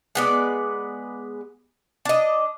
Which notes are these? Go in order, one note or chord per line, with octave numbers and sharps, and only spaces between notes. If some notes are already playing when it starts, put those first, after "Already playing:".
G#3 B3 D5
D4 D#5